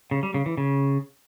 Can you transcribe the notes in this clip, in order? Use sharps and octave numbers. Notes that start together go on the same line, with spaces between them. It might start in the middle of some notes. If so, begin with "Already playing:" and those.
C#3
G3
C#3
E3
C#3